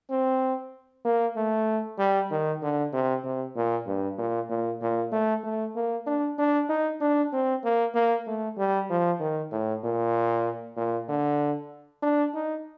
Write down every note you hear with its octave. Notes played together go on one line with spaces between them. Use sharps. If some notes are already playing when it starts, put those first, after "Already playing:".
C4
A#3
A3
G3
D#3
D3
C3
C3
A#2
G2
A#2
A#2
A#2
A3
A3
A#3
D4
D4
D#4
D4
C4
A#3
A#3
A3
G3
F3
D#3
A2
A#2
A#2
D3
D4
D#4